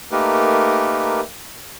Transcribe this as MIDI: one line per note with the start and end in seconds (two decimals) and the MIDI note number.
0.12 1.21 57
0.12 1.21 58
0.12 1.21 63
0.12 1.21 67
0.12 1.21 70
0.12 1.21 71